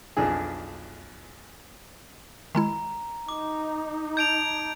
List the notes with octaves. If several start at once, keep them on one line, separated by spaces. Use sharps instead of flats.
B1 F2 D4 G#4
D#3 G#3 E4 A#5
D#4 D6
A5 G6 G#6 D7 F7